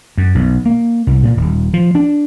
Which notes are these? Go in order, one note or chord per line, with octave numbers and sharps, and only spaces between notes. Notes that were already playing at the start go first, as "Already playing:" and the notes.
F#2
B1
A#3
C2
A#2
D#1
F3
D4